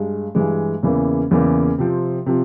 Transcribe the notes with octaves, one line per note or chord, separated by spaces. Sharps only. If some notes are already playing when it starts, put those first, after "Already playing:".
Already playing: G2 G#3
G2 E3 G#3
E2 C#3 E3 A#3
E2 C#3 E3 A#3
C3 F3 C4
C3 F3